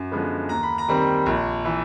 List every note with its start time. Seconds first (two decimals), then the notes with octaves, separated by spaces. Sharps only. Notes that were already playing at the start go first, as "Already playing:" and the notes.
Already playing: F#2
0.12 D3 F3 G#3 B3
0.49 D#2 A#5
0.63 B5
0.78 A#5
0.88 D#3 G3 C4
1.26 A#1
1.65 E3